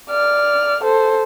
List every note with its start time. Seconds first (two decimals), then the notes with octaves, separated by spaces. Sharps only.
0.10 D5 F6
0.83 A4 C5